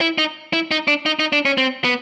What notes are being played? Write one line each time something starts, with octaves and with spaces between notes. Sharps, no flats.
E4
D#4
E4
D#4
D4
D#4
D#4
D4
C#4
C4
B3